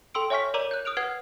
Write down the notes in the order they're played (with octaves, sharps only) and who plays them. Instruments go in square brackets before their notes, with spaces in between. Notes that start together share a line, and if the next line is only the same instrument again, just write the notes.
[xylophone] A4 G5 C6 E6 D7
C#5 E5 G#5 C#6 F6 B6
A#4 C#5 D5 A#5 D6 D#7
F#6 G6
D#6 F6 D7 F7
B4 F#5 F6 G#6 C7